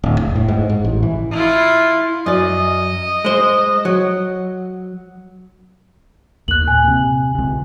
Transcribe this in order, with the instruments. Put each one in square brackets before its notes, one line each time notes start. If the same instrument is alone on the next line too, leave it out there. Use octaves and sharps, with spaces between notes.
[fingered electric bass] D1
F1
A2
G#2
G#2
A1
E3
[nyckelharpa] E4 F4
[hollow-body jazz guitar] F#2 D5 [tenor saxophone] D#5
[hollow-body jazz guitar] G#3 C5
F#3
[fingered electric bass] D#2 [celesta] F#6 F#7
[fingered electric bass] A#2 [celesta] G#5
[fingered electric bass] C3
C#2 C3